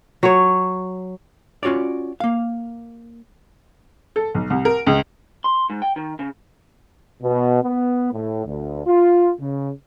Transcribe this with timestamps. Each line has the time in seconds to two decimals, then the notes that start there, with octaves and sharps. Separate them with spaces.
0.23 F#3 C#5
1.63 C#4 F4 F#4 C#5 D5
2.20 A#3 F5
4.16 A4
4.35 B1
4.50 C2
4.65 A#4
4.87 C#2
5.44 C6
5.70 G#2
5.82 G5
5.96 D#3
6.19 C#3
7.23 B2
7.63 B3
8.13 A2
8.46 D2
8.86 F4
9.40 C#3